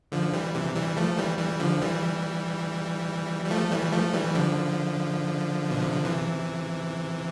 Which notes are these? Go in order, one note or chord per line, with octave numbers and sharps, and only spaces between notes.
D3 F3
E3 G3
C3 E3
E3 G3
F3 A3
E3 G3
E3 G3
D3 F3
E3 G3
G3
F3 A3
E3 G3
F3 A3
E3 G3
D3 F3
B2
C3
D3
C3 E3